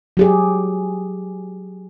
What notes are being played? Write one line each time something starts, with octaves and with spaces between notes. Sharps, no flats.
F#3 G4 G#4